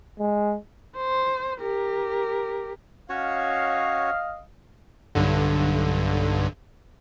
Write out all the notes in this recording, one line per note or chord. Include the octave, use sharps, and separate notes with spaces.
G#3
C5
G4 A#4
C#4 F#4 C#5 D#5 F5
B1 G2 D3